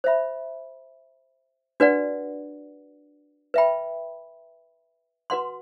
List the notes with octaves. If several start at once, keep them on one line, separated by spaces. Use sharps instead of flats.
C5 E5 B5
D4 F#4 B4 D5 F#5
B4 E5 G5 B5
F#4 B4 F#5 C6